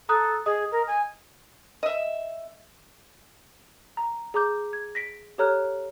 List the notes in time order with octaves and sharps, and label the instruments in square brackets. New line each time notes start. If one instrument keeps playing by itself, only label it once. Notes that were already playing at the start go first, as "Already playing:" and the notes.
[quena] A4 [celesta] A#5 D#6 F#6
[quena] G#4 [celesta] D#5 D#6
[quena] A#4
G#5
[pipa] D#5 E5
[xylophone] A#5
G#4 A#5 D6 G6
G#6
A#6 B6 D7
G4 A4 C#5 A#5 F6 F#6